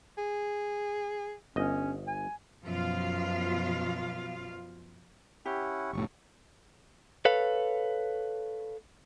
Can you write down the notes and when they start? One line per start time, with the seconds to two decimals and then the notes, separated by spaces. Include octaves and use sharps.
0.18 G#4
1.56 G1 C#4 D#5
2.07 G#5
2.65 F#2 B2 F3 F4 F5
5.46 C#4 E4 G4 F#5
5.93 F1 A2 C#6
7.25 A4 B4 C#5 F5